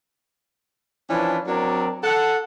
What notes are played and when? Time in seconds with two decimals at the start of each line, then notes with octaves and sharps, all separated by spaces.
1.09 E3 F3 C#4 D4 B4
1.47 F#3 C4 D4 A#4 D5
2.03 A4 F#5